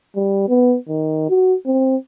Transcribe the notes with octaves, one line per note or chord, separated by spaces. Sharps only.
G3
B3
D#3
F#4
C4